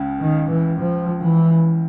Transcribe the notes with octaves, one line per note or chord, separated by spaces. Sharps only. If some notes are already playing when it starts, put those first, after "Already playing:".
Already playing: C#2 C#3
D#3
E3
F3
E3